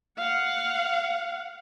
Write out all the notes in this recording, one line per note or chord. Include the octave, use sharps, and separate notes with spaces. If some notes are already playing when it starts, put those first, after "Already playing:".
F5 F#5